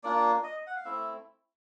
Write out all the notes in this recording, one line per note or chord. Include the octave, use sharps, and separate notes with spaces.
A#3 D4 F4 D5
D#5
F#5
F5
A3 C4 E4 E5